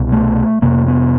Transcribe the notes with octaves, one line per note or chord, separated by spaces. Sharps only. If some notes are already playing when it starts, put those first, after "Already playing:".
Already playing: C2 B2
A3
F2 C3 A#3
B3